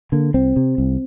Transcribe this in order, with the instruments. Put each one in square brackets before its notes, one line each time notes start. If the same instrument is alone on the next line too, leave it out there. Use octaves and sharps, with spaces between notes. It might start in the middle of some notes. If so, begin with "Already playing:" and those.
[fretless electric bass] D3 A#3
C2 C4
C3
C2